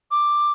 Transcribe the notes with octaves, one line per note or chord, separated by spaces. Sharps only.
D6